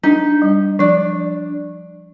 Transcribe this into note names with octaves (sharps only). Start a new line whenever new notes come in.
D4 D#4
G3
F3 D4